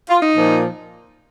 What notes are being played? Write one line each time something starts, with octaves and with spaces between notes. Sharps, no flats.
F4
D#4
A#2 F3